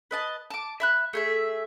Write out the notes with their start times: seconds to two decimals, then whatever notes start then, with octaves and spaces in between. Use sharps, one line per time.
0.11 B4 D#5 A5
0.50 A5 D6
0.80 E5 B5 F#6
1.13 A3 G#4 E5